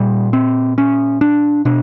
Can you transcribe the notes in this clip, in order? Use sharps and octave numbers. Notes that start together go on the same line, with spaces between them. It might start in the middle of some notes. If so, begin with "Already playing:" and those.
Already playing: A#2 G3
C4
C#4
D4
B2 D4